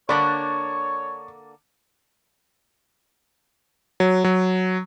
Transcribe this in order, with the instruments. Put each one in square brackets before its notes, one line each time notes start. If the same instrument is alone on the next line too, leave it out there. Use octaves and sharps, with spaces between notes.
[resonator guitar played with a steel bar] D3 A#3 D4 [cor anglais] C#5 [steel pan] D5 B5 [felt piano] C#6
[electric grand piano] F#3
F#3